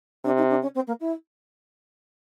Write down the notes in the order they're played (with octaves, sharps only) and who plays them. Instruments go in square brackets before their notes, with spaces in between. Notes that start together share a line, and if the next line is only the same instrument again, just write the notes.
[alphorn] C3 [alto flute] D4
[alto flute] D#4
D4
C#4
C4
A#3
E4